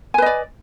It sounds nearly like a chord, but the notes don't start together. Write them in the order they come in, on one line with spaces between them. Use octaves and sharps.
G#5 B4 D#5 D5